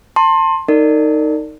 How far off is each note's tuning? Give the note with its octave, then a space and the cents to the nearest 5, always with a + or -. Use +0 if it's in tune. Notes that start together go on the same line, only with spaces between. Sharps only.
A5 +35 C6 +25
D#4 +0 A#4 -40 D5 +0